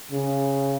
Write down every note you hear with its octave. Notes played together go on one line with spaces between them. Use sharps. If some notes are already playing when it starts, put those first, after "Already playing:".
C#3